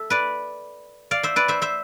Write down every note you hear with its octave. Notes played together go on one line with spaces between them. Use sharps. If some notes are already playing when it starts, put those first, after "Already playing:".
Already playing: A4 E5
B4 D5
D5 F5
C5 E5
B4 D5
C5 E5
C5 E5